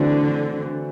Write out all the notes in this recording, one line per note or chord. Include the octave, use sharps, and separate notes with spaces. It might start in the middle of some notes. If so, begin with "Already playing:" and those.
Already playing: D3 E3 A3 C4 F#4